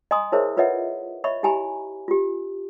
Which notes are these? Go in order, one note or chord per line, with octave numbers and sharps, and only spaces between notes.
D#5 G#5 A#5 C6 D#6
E4 G#4 A#4 C5 C#5 E5
F4 B4 C#5 D#5 E5 F#5
C#5 D#5 E5 B5 C#6
E4 G4 G#5 A#5 B5
F4 G4